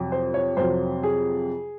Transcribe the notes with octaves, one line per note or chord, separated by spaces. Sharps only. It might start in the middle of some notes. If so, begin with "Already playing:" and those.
Already playing: F2 C3 F#3
C5
C#5
F2 C3 F#3 C5
G#4